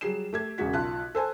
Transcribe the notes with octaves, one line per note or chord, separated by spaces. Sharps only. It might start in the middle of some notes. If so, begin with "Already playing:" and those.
F#3 G3 G#4 C7 E7
A3 G4 G#6
E1 C#3 G#3 F#4 B6
B1 F4 A5 F#6
A4 C5 G#5 A5